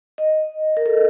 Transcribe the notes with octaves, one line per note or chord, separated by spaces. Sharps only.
D#5
A#4
A4